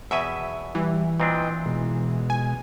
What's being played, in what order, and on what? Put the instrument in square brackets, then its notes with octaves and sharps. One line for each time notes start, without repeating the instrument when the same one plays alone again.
[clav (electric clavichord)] E2 B2 G#5 [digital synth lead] E5
[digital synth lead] E3 [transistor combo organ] G3
[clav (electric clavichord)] A#2 C4 D4 [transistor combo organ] B4 D#5 G5
[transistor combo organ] B2 G#3
[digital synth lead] G#5